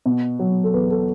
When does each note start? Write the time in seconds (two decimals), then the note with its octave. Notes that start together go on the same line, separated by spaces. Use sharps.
0.06 B2
0.39 F#3
0.64 A4
0.74 E2 B4
0.91 A4